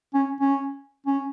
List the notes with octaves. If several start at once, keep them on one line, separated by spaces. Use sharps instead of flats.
C#4
C#4
C#4